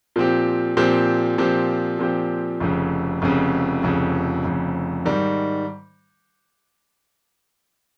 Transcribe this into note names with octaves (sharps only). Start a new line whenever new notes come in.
A#2 F3 C4 G4
A#2 F3 C4 G4
A#2 F3 C4 G4
A#2 F3 C4 G4
F1 F2 C#3
F1 F2 C#3
F1 F2 C#3
F1 F2 C#3
G#2 D#3 G3